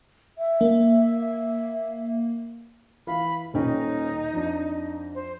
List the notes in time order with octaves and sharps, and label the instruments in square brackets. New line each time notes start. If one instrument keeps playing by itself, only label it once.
[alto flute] E5
[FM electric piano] A#3
[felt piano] E3 F5 [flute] B5
[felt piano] D#1 C#4 G5 [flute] D#4
[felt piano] F2 D4
[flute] C5